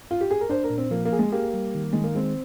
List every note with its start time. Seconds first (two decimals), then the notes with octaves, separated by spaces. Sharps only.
0.11 F4
0.21 G4
0.31 G#4
0.41 A#4
0.50 D4 C5
0.64 A#4
0.70 A#2
0.78 C4
0.91 F3 A#3
1.05 A#3
1.13 G#4
1.19 G#3
1.32 A#3 G4
1.54 G3
1.75 D#3
1.93 D#3 G#3
2.04 A#3
2.15 G#3 C4